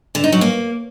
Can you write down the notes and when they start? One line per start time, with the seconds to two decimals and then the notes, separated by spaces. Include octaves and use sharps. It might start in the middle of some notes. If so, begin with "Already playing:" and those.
0.15 D3
0.24 D#4
0.32 F#3
0.41 A#3